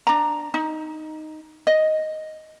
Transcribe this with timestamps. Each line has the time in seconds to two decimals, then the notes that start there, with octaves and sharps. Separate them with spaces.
0.07 D4 A#5
0.54 D#4
1.67 D#5